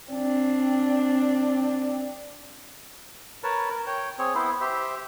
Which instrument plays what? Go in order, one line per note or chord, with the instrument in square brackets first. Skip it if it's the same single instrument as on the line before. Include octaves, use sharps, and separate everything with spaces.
[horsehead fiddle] C4 D4
[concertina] A#4 B4 C#5 A5
A#4
C#5 G5
C4 G#4 C#5
B3 E4 C5
G4 C5 E5